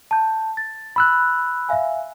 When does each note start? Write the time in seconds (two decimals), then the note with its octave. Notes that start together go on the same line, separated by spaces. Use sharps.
0.11 A5 G6
0.57 A6
0.96 B5 E6 F#6
1.69 E5 F5 G#5